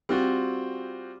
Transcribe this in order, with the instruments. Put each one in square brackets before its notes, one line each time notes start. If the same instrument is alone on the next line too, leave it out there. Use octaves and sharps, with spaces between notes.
[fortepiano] G3 [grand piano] C4 F4 F#4